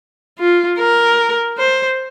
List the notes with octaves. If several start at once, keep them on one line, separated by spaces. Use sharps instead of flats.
F4
A#4
C5